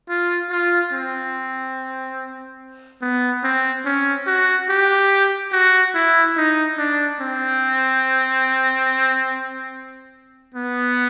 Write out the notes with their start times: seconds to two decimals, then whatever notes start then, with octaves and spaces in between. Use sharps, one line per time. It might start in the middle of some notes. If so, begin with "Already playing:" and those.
0.09 F4
0.51 F4
0.93 C4
3.02 B3
3.43 C4
3.85 C#4
4.27 F#4
4.69 G4
5.52 F#4
5.95 E4
6.37 D#4
6.78 D4
7.21 C4
10.54 B3